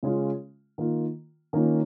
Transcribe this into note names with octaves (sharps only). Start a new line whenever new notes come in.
C#3 G#3 C#4 F4
D#3 A#3 F4
D#3 A#3 C#4 F4